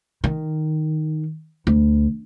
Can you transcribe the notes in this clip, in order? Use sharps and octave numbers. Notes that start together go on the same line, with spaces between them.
D#3
D2